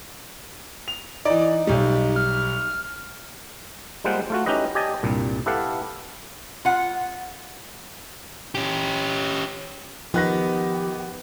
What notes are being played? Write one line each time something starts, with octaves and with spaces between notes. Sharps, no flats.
F7
E3 D#4 D5
B1 G3
F6
G3 G#3 A#3 F4 C5 F#5
A3 F4 F#4
C#4 D#4 E4 G4 B4 D#5
G4 D5 D#5 G#5 A5
C2 G2 A#2
E4 G4 A4 B4 F5 F#5
F4 F#5
C#4 G4
D#3 F3 B3 G4 F#6 A#6